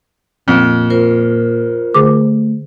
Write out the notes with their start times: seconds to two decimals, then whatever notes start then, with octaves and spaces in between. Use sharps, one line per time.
0.48 F2 A#2
0.90 F4 A#4 C5
1.94 D3 A3 G#4 D6